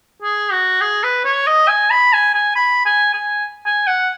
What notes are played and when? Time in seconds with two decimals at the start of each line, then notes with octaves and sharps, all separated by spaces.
0.22 G#4
0.52 F#4
0.81 G#4
1.03 B4
1.25 C#5
1.47 D#5
1.68 G#5
1.90 B5
2.13 G#5
2.35 G#5
2.55 B5
2.86 G#5
3.14 G#5
3.66 G#5
3.87 F#5